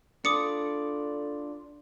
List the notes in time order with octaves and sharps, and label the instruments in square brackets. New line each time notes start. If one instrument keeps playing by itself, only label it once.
[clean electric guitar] D4 F4 [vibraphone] A4 [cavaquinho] D5 [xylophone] D6 D#6 C#7